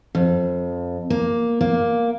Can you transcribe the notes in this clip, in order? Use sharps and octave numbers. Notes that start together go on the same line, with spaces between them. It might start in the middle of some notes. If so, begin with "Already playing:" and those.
F2
A#3
A#3